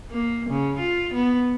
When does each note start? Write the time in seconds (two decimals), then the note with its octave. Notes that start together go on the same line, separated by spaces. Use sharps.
0.11 A#3
0.49 C#3
0.79 F4
1.13 B3